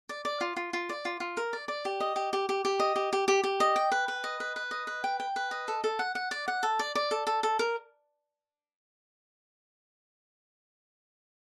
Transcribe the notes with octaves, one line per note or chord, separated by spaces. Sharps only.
D5
D5
F4
F4
F4
D5
F4
F4
A#4
D5
D5
G4
D#5
G4
G4
G4
G4
D#5
G4
G4
G4
G4
D#5
G5
B4
B4
D#5
B4
B4
D#5
B4
G5
G5
B4
D#5
A4
A4
F#5
F#5
D5
F#5
A4
D5
D5
A4
A4
A4
A#4